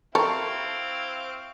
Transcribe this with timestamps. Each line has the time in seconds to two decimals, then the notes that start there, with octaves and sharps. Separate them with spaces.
0.15 C4 E4 A4 A#4 F5 C#6